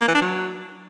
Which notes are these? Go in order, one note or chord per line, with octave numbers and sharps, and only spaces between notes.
A#3
E3
D4
F#3